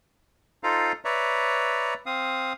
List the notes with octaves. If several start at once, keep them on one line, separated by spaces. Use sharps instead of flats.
D#4 F4 A4 C5 F5 A#5
B4 C#5 D5 E5 A#5
C4 F5 D#6